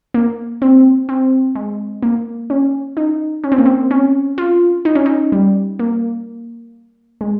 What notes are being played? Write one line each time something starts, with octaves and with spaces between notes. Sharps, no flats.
A#3
C4
C4
G#3
A#3
C#4
D#4
C#4
C4
A#3
C4
C#4
F4
D#4
C#4
D#4
G3
A#3
G#3